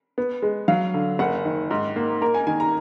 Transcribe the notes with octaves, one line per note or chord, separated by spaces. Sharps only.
B3
G#3
F#3 F5
D3
F#1 F#5
D#3
G#2
A#3
A#3 A#4
G#5
D#3 G#5
A#5